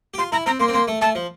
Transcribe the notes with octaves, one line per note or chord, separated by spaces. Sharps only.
G4
F4 C6
E4 A#5
C4 A#5
A#3 C6
C4
A#3 C6
A3
A3 A5
F3